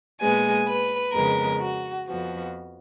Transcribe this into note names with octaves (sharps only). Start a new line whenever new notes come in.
A#2 G#3 B3 G#5
B4
F2 C#3 G#3 B3 A#4
F#4
F2 F3 B3 F#4